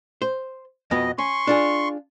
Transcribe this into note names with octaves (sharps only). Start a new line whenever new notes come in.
C5
F2 B2 B3 D#5
C#4 C6 C#6
D4 F4 G#4